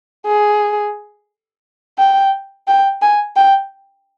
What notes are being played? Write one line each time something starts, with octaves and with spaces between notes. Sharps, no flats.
G#4
G5
G5
G#5
G5